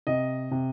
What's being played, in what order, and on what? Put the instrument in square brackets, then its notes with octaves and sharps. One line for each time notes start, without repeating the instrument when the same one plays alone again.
[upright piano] C3 D#5
C3